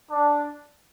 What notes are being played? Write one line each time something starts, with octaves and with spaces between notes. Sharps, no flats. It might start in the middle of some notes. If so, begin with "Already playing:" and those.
D4